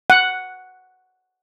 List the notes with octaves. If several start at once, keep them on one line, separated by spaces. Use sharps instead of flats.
F#5